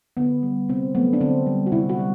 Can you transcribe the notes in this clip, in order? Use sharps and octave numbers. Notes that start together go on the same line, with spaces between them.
D3 B3
G3
C3 C4
F#3 A3 B3
D4
D3 C4
G3
F#4
C3 E4
F#4
G3